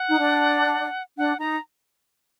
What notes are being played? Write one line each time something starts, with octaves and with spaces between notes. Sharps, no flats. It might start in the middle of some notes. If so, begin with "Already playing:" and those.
Already playing: F#5
D#4
D4
D4 F#5
D#4 A#5